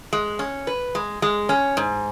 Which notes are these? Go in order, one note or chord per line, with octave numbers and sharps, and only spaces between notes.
G#3
C#4
B4
G#3
G#3
C#4
G#2